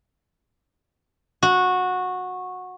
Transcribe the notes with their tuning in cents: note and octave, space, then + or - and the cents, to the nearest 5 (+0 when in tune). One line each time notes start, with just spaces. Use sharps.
F#4 -15